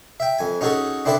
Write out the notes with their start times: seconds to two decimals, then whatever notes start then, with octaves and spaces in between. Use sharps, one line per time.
0.20 E5 G5
0.39 F2 G#5
0.61 C#4 D#4 F#4 G#4 A4
1.05 C4 D4 E4 A4 B4 A5